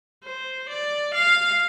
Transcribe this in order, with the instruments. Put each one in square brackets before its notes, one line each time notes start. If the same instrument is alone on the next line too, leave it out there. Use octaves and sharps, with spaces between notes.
[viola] C5
D5
F5